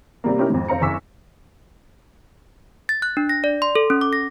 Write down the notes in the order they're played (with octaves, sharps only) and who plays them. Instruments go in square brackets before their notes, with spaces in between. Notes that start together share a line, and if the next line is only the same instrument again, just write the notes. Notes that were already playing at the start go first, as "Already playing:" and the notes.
[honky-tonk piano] C3 G3 A#3
C#4 D#4 E4 G4 A#4
F2 G#2
F1 C4 F5 A#5 C#7
F#1 G#5 C#6 D6 E6 B6
[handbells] A6
F#6
D4
A#6
D5
C6
A4
C#4
D6
A#6